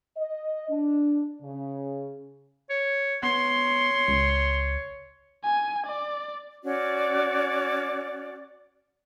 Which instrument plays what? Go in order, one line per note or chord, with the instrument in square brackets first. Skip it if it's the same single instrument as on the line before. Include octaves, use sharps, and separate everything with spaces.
[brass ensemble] D#5
D4
C#3
[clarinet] C#5
[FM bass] B3 [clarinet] C#5 [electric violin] C6
[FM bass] C#2
[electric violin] G#5
D5
[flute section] C#4 F#4 D5